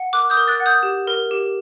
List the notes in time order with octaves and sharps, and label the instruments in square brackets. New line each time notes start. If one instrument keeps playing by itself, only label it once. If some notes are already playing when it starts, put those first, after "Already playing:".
Already playing: [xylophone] F#5
A#4 D6 F#6
D#6 G6
A#4
F#6 A6
F#5
D#6 G6
G4
A#4
G4